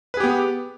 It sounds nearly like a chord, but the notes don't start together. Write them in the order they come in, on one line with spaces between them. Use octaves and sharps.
B4 G#4 G4 B3